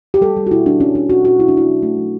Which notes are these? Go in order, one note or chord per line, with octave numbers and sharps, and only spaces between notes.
G4
G3 A4
G3
F#4
B2 E4
G3 D4
G3 C#4
G3 D4
B2 F#4
B2 F#4
F#3 E4
D4
A3 E4
F#3
A3
F#3